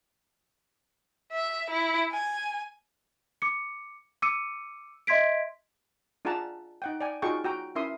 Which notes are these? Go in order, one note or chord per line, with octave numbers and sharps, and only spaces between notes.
E5
E4
G#5
D6 C#7
D6 E6 C#7 D#7
D#5 E5 C6 G#6 B6 D7
D4 F4 G#4 F#5 A5 A#5
D#4 F#5 G5
D5 G5 G#5
D#4 F4 F#4 G#4 G5 C#6
F#4 G5 A#5
C#4 E4 A#4 E5 C6 D#6